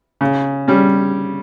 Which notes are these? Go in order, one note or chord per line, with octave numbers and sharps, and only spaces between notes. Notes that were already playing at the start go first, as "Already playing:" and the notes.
C#3
G3 C#4